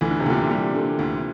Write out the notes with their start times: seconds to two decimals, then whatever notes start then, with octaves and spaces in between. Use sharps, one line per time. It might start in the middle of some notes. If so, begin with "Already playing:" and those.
0.01 D2 E3
0.11 D3
0.20 C3
0.26 D2 A#2 D3
0.50 G3
0.75 D3
0.99 D2